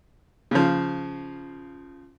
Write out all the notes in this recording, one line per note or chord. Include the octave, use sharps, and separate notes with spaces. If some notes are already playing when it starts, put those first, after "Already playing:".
C#3 F3